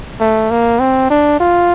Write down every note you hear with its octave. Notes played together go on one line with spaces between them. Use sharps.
A3
A#3
C4
D4
F4